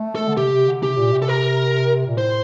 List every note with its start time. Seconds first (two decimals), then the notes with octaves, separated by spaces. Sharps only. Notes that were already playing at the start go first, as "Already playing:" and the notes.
Already playing: A3
0.16 A4
0.28 D3
0.37 C3 G4
0.53 C3
0.68 D3
0.82 C3 G4
0.97 A#2
1.13 C3
1.22 A4
1.28 A#4
2.07 A#2
2.18 A2 C5